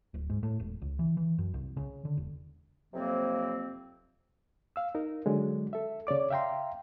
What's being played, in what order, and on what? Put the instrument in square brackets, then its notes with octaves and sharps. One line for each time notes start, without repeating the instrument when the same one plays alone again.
[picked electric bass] D1
G#2
A2
E1
C#2
E3
E3
F#2
C2
C#3
D3
E1
[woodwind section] F2 C3 F#3 A#3 C4
[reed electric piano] F5 E6
D#4 A#4
D3 F#3 G#3
A4 E5
C#3 C#5 D5 D6
E5 F5 G5 A#5 C6